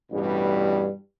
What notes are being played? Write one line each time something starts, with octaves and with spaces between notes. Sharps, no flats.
A1 G2 B2 G3